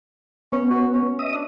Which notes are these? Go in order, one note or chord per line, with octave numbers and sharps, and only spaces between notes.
B3 C#4
F#4
C#4
D#5 E5 D#6
D4